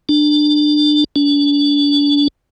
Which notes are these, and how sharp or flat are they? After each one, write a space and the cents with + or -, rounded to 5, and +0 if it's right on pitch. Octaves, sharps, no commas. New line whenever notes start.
D4 +20
D4 -35